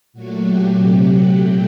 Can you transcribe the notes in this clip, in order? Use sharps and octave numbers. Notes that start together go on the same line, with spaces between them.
A#2 F#3 A3 F#4
G4
C3 F#3 A3
F#5
A#2 F#3 A3 G5